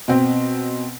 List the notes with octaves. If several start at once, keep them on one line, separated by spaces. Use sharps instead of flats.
B2 C4